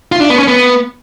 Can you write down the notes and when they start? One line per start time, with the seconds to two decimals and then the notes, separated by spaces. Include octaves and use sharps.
0.12 F4
0.21 D4
0.30 B3
0.39 C#4
0.48 B3